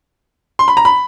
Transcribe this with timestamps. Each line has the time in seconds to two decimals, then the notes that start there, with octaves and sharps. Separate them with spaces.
0.59 C6
0.68 B5
0.77 A#5
0.85 B5